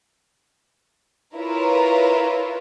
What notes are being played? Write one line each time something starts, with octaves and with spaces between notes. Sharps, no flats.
E4 F4 A#4 B4 C#5